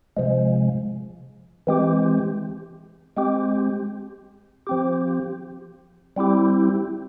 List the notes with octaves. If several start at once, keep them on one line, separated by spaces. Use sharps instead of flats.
C3 F3 G#3
E3 G#3 C4 G4
G#3 C4 G4
F3 C4 G4
G3 C4 E4 G4